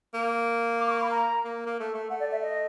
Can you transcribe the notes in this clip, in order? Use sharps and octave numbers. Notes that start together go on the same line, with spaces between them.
A#3
D6
C#6
B5
A#5
A#3
A#3
A3
A3
A3 F#5
D5
E5
D#5